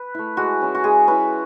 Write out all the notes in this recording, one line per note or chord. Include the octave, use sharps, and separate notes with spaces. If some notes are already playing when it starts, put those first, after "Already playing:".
Already playing: B4
A3 E4
G#3 F#4
C#4 E4
F#4
G#3 G#4
C#4 E4 B4